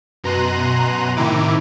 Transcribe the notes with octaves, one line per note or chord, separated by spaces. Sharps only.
F#2 B2 A#5 C6 F#6 D#7
A2 C3 D#3 D#4 E4 D6